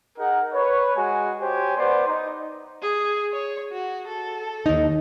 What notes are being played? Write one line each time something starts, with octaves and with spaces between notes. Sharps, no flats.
D#4 G#4 A#4 F#5
B4 C#5
G#3 F#4 G#5
G4 C5 C#5 G#5
B3 C5 D5 C6
D#4
G#4
C#5
F#4
A4
D#2 D#4